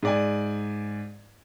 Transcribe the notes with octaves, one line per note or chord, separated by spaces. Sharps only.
G#2 D5 G#5